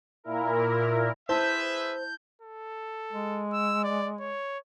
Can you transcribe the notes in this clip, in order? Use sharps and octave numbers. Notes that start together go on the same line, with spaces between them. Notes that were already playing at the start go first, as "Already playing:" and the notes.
A#2 E4 A#4
E4 G#4 B4 C5 E5 A5 G6
A4
G#3
E6
D5
C#5